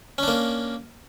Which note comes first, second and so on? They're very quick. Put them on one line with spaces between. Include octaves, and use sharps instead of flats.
C#4 D4 A#3